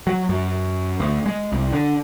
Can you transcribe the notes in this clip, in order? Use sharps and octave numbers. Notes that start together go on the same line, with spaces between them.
F#3
F#2
D2
G#3
C2
D3